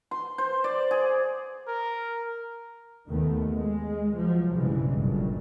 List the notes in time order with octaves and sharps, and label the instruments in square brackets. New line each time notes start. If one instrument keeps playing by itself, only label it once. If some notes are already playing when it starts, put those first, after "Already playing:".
[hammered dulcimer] C6
C5
D5
G#4
[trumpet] A#4
[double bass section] D#2 D#3 A3 B3
G#3
F3 F#3
B1 G2 C#3 E3 G#3
G1 G2 A#2 F#3